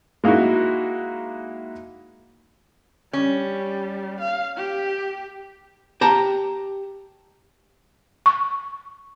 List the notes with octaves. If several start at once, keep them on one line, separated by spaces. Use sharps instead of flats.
G#3 A#3 D#4 E4 F#4
G3 C#4
F5
G4
G4 A5 A#5
C#6